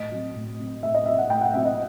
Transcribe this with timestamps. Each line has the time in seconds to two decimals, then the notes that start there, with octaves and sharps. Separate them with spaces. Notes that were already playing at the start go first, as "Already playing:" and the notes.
Already playing: A2 D#5
0.11 F#3 C4
0.35 A2
0.59 F#3 C4
0.83 A2 E5
0.94 D#5
1.06 F#3 C4 E5
1.18 F#5
1.29 A2 G5
1.41 F#5
1.53 F#3 C4 E5
1.65 D#5